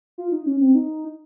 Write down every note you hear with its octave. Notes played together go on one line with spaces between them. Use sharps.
F4
D#4
C#4
C4
D#4